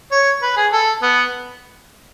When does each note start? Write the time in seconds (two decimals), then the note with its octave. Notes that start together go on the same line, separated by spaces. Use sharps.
0.12 C#5
0.43 B4
0.57 G#4
0.73 A4
1.02 B3